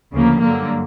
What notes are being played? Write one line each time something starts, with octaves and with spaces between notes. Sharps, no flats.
D2 C#3 F3 A#3
G2 D3 F#3 A#3